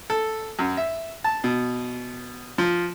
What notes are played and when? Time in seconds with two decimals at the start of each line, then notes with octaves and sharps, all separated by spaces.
0.10 A4
0.59 F#2
0.77 E5
1.24 A5
1.44 B2
2.58 F3